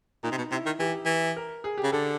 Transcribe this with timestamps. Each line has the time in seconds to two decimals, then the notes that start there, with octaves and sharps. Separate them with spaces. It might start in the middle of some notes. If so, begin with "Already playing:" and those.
0.23 A#2 D#4
0.32 C3
0.38 B2
0.51 C3 E4
0.66 D#3
0.80 E3 G4
1.06 E3
1.36 A#4
1.64 G#4
1.78 G4
1.84 C#3
1.92 D3 A4